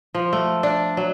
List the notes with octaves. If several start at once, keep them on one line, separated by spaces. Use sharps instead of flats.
F3
A3
D4
F#3